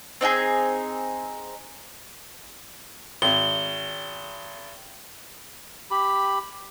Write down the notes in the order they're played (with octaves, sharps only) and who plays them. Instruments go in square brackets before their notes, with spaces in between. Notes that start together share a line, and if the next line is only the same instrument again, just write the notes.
[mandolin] C4 D#4 F#4 G#4
[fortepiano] G#1 [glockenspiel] G7
[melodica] G4 B5